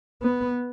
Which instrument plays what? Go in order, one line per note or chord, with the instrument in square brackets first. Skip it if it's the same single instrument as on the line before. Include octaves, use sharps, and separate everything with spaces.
[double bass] B3